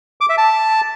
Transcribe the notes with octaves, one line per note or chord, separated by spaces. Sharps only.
D6
E5
A5